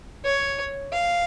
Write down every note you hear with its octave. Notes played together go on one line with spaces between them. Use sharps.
C#5
F5